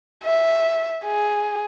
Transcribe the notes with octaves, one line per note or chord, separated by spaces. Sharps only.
E5
G#4